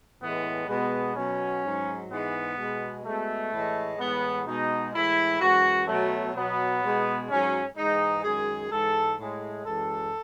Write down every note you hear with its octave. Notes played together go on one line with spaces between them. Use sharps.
A2 E3 G#3 B3
B2 G#3 B3
B2 F#3 C#4
G#2 F#3
G#2 E3 G#3 B3
B2 G#3
B2 G#3 A3
A2 E3 G#3
A2 E3 G#3 B3
B2 G#3 D#4
A2 E3 G#3 E4
F#2 E3 G#3 F#4
B2 F#3 A3
B2 F#3 B3
B2 G#3
G#2 F#3 C#4
G#2 E3 G#3 D#4
F#2 D#3 G#3 G#4
G#2 E3 G#3 A4
A2 G#3
F#2 E3 G#3 A4